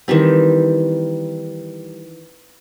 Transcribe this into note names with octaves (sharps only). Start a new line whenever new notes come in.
D#3 E3 G3 C4